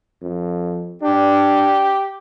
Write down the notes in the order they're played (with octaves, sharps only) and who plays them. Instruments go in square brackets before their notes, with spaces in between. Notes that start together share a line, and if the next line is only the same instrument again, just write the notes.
[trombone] F2
[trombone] D4 [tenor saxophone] G4